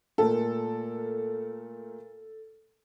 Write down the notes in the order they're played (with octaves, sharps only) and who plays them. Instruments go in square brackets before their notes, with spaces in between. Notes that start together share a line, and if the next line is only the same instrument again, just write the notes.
[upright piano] A#2 A3 A#4 [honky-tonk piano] A4